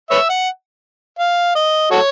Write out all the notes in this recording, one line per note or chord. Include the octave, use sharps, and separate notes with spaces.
B4 C#5 E5
F#5
F5
D#5
F#4 A4 C#5